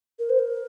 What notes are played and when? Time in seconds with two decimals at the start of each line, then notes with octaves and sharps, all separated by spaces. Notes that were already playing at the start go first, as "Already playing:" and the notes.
0.19 A#4
0.30 C5
0.39 A#4